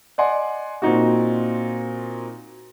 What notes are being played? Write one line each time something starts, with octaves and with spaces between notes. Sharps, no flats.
D5 D#5 F#5 G#5 C6
A#2 C4 D#4 F#4